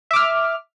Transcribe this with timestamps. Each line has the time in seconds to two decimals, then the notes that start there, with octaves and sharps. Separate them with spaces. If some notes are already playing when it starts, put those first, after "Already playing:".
0.11 E5
0.13 D6
0.16 F6